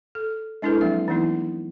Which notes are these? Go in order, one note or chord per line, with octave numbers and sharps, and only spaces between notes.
A4
G#3 D4 E4 G#4 A4 B4
F3 F#3 A#3 C4 E5
E3 F#3 A3 B3 D#4 E4